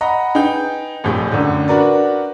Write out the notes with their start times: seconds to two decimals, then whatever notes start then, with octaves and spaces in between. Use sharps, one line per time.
0.01 D#5 F#5 A#5 B5
0.35 D#4 G#4 B4 G5 G6
1.04 A#1 F2 A2 G3 G#4 G6
1.31 F#2 A2 D3
1.68 D4 F#4 A#4 B4 D5